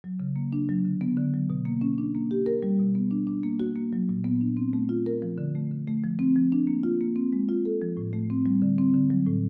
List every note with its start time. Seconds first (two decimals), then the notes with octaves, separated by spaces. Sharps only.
0.04 F#3
0.20 C#3
0.36 A#3
0.53 D4
0.69 F#3
0.85 D3
1.01 B3
1.17 D3
1.34 F#3
1.50 B2
1.65 A#3
1.81 C#4
1.98 D4
2.15 A#3
2.31 G4
2.46 A#4
2.63 G3
2.79 B2
2.95 B3
3.11 D4
3.27 D4
3.43 A#3
3.60 F#4
3.76 A#3
3.93 F#3
4.09 A#2
4.24 B3
4.41 D4
4.57 C4
4.73 A3
4.89 F4
5.06 A#4
5.22 F3
5.38 D3
5.55 A3
5.71 D3
5.87 A3
6.04 F3
6.19 C4
6.36 F3
6.52 D4
6.67 A#3
6.83 F4
7.01 A#3
7.16 C4
7.33 G#3
7.49 F4
7.65 A4
7.82 F3
7.97 A2
8.13 A3
8.30 C4
8.46 G3
8.62 D3
8.78 C4
8.94 D3
9.10 F#3
9.26 A2